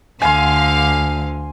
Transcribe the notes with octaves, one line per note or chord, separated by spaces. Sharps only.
D2 D3 F5 G#5 C6